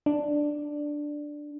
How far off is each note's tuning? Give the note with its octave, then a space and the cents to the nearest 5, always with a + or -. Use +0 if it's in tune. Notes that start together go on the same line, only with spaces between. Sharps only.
D4 +5